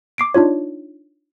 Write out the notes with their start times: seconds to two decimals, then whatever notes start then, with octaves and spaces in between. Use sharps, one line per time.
0.18 D6 C7 D7
0.34 D4 D#4 F4 C#5